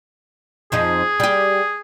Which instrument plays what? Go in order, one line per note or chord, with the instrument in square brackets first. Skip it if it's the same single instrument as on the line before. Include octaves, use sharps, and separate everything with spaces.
[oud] F2 F3 D#4 [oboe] G#4
[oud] G3 G4